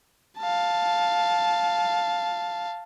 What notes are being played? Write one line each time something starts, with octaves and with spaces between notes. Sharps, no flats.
F5 A5